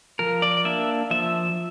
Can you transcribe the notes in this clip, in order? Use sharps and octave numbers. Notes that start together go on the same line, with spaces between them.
F3 A#4
D5
A#3 D4 E5
F3 E5